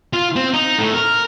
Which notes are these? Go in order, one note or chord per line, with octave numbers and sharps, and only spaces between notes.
F4
C4
D#4
A2
A#4